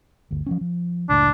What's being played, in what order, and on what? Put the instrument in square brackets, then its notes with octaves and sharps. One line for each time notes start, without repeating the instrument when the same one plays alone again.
[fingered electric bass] G1 D2
F3 G3 C#4
F3
[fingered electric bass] F#1 C#2 A2 [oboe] D4